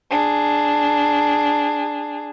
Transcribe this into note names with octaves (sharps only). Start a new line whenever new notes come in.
D4 G#4